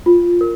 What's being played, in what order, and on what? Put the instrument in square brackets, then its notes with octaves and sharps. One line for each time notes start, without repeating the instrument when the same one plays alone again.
[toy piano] F4
A#4